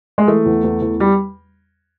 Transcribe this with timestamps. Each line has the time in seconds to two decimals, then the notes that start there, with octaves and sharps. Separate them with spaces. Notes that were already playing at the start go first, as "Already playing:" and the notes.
0.18 G#3
0.27 E3 A3
0.46 E2
0.64 E2
0.82 E2
1.00 G3